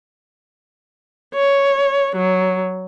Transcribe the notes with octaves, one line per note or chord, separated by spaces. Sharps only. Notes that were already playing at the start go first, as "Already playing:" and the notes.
C#5
F#3